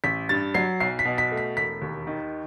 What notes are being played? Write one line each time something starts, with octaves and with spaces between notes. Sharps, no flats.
A1 B6
G2 A6
F#3 C7
B1 C7
B6
B2
B6
A3
B6
E1 B6
D#2
D#3